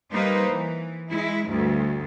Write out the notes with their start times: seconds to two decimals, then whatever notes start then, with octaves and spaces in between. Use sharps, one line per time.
0.13 G3 A#3 D#4 B4 C5
0.49 E3
1.11 G#3 E4
1.49 D2 G2